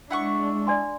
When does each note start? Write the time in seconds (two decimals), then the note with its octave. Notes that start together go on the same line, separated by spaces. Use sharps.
0.11 G#3 D4 E4 F#5 C#6
0.67 D5 G#5 C6